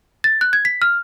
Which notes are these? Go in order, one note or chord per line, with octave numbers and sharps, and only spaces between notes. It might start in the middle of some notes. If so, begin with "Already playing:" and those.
A6
F#6
G#6
B6
F6